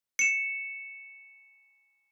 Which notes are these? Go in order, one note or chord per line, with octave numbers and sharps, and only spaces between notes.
C#7 E7